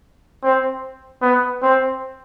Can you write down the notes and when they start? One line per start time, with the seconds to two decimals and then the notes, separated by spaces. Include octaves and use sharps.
0.43 C4
1.22 B3
1.62 C4